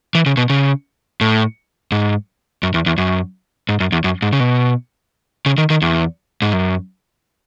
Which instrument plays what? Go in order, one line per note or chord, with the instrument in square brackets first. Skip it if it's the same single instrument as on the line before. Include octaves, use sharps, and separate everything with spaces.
[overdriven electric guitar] E3
C#3
B2
C#3
A2
G#2
F#2
E2
E2
F#2
G#2
F#2
E2
F#2
G#2
C#3
B2
C#3
D#3
D#3
E2
G#2
F#2